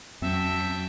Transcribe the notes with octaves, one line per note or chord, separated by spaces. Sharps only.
F2 F#3 C4 C#4 E5 G5 A5